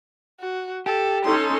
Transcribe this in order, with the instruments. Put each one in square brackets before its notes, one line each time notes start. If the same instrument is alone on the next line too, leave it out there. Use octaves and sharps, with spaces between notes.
[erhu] F#4
[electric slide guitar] G4 [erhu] A4
[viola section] C#4 D#4 A4 [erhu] C6